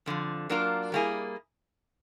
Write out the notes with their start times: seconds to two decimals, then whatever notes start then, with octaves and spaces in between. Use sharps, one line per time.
0.06 F2 D3 F3
0.50 F#3 A#3 D4 F4 A#4
0.92 G3 A#3 C#4 E4 G#4